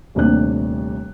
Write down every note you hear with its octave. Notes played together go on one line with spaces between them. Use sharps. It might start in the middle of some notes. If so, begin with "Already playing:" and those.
D#1 D#2 C3 A3 D4 F#6